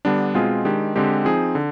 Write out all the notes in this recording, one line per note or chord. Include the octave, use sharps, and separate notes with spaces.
D3 G3 B3 D4
B2 G#3 C4 F4 G#4
D#3 G#3 D4 G4
D3 G#3 C4 G4
F3 C4 D#4 G#4
D3